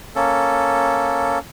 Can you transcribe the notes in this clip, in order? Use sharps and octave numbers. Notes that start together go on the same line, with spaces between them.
A#3 C#4 A4